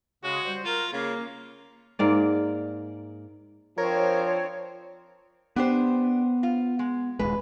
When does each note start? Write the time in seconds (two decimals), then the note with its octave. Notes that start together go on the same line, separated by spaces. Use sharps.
0.24 C#3 G#3 F#4
0.45 G3 C5
0.65 F4 A#4
0.93 C#3 A#3
1.99 G#2 A#3 D5
3.78 F3 C4 D4 A#4 C#5
5.56 B3 D4 G4 C5
6.43 F4
6.79 G#3
7.19 D#1 C2 G#3 B4